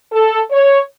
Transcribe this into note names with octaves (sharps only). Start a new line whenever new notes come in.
A4
C#5